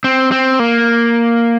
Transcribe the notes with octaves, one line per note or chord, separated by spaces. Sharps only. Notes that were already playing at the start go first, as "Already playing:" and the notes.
C4
C4
A#3